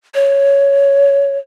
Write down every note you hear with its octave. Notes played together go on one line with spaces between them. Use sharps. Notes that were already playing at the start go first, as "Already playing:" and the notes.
C#5